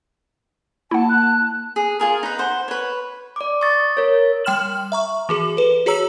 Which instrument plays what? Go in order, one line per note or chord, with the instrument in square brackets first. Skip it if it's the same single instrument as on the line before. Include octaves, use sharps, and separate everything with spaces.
[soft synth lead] A#3 [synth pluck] E4 F#5 [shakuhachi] A5
[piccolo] F#6
[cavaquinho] G#4
F4 G#4 A#4
D#4 B4
C5 F#5
B4 C#5
[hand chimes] D5 D6
C#6 D#6 A6
A#4 C#5
[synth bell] G3 G5 C6 F6 E7 F#7
E5 A#5 C#6
E3 F#4 G#4
A4 B4
F#4 G#4 C#5 A#5 E6